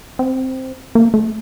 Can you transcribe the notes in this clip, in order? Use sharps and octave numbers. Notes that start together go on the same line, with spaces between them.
C4
A#3
A3